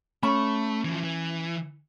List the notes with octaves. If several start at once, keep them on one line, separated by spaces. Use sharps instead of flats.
A3 C#4 B5
E3 F3
E3